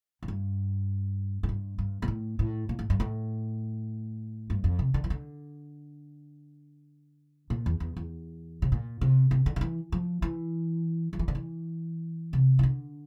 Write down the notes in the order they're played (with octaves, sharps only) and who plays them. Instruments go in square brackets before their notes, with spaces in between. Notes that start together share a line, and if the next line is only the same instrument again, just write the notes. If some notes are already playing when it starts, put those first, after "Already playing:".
[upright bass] A2
G2
A2
G2
G2
A#2
A2
A2
A#2
A2
G2
A2
G2
F2
C3
D3
E3
D3
A#2
E2
E2
E2
C3
A#2
C3
C3
D3
D3
E3
F3
E3
F3
E3
D3
E3
C3
E3
D3